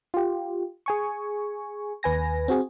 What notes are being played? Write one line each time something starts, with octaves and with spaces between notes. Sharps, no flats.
F4 G4
G#4 G#5 C#6
D#2 B4 G#5 A#6
C4 F#4 G#4